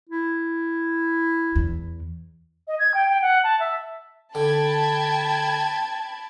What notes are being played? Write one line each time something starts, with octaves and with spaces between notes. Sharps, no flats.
E4
E2
D#5
G#6
G5
G5
F#5
A5
E5
D3 G5 A5 B5 G#6